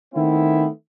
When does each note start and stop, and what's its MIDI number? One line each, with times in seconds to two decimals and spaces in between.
0.14 0.67 51
0.14 0.67 57
0.14 0.67 59
0.14 0.67 60
0.14 0.67 64